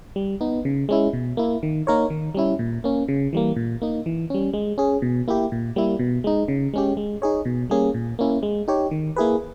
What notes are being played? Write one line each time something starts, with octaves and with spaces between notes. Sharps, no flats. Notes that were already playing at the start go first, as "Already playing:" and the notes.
G3
B3 D#4
C#3
G#3 C#4 E4
B2
A#3 E4
D#3
A#3 D#4 A#4 C#5
D#3
G3 C#4 E4
A#2
A#3 C#4
C#3
E3 G3 A#3
A#2
A#3 D#4
E3
G3 C#4
G#3
C#4 G#4
B2
A#3 E4 G4
A#2
G3 A#3 E4
B2
G#3 D#4
C#3
G#3 C#4 G4
G#3
D#4 G#4 C#5
B2
G3 A#3 C#4 G#4
A#2
A#3 C#4 E4
G#3
D#4 G4 C#5
D#3
A#3 E4 G#4 B4